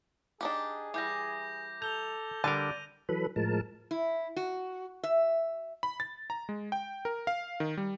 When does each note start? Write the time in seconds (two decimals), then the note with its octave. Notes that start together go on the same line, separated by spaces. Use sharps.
0.41 D4 D#4 G4 G#4
0.94 E3 G3 D6 G6 A#6
1.82 A4 A#5 G6 F7 G7
2.44 D3 G3 A#4 D5 A5 D#7
3.09 E3 F#3 A4 B4 B5
3.36 A2 F3 G#3 A#4 A5
3.91 E4
4.36 F#4
5.03 E5
5.83 B5
6.00 A6
6.30 A#5
6.49 G#3
6.72 G5
7.05 A#4
7.27 F5
7.60 D#3
7.77 G3